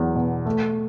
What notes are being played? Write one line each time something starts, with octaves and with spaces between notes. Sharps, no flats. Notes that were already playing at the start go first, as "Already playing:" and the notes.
Already playing: E2 F#3
B2
A3